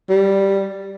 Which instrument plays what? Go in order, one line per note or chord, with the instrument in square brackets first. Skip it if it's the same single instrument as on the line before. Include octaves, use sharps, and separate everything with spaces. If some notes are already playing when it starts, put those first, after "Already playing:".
[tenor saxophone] G3